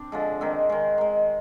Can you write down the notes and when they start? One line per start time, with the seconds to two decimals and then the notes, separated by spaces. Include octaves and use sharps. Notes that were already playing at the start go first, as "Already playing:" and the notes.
Already playing: C4 D4
0.12 D3 F3 G#3
0.41 D#3 G#3 C4
0.70 D#3 G#3
0.98 D#3 G#3